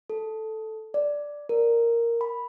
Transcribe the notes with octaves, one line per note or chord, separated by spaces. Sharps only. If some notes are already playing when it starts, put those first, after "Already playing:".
A4
D5
A#4
B5